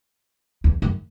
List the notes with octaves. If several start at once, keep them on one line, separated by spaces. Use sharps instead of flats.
E2
F#2